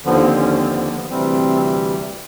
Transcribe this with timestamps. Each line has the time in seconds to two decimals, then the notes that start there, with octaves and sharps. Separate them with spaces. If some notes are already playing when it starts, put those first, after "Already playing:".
0.05 D#2 D3 F3 B3
0.23 C4
0.39 C#4
0.58 C4
0.70 B3
0.84 A#3
0.96 B3
1.10 D2 C3 E3 G3 C4